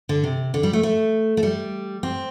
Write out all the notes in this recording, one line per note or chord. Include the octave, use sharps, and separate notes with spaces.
D3
C3
D3
G3
A3
A3
A3
G3
C4